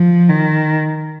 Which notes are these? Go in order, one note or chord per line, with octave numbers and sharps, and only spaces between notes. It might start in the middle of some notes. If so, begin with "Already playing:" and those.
Already playing: F3
D#3